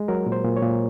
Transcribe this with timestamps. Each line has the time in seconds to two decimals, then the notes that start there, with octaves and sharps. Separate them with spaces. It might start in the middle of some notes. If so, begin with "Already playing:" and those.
Already playing: G#3
0.08 F#3 A#4
0.26 A#2
0.32 C5
0.45 A#2
0.57 C#5
0.62 A#2